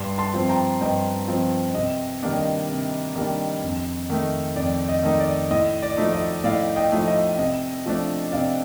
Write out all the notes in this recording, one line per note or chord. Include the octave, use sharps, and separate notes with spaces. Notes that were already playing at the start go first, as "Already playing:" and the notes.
Already playing: G2 C6
A5 C6
F3 C4
G5 A#5
G2 D#5 G5
F3 C4
C3 D#5
D#3 G3 A#3 D4
D#5
C3
D#3 G3 A#3 D4
F2
D#3 A3 D#4
F2 D5
D#5
D#3 A3 D#4
D5
A2 D#5
D5
F3 A3 D#4
D#5
A2 D5 F5
D#5 G5
F3 A3 D#4
D#5
C3 D#5
F3 A3 D4
C3 D5 F5